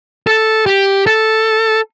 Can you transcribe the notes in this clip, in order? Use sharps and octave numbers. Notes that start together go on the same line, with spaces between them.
A4
G4
A4